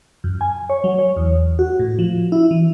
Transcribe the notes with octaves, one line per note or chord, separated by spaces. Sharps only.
F#2
G#5
C#5
F#3
C#5
E2
F#4
A2
F3
E4
E3